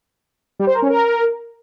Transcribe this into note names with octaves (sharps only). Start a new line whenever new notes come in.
G3
C5
A#4
C#4
A#4